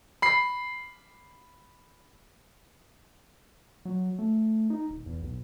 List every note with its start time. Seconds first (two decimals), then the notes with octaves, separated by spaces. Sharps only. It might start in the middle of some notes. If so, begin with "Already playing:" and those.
0.22 B5 C7
3.85 F#3
4.19 A3
4.70 D#4
4.89 D#1
5.06 E2
5.22 B1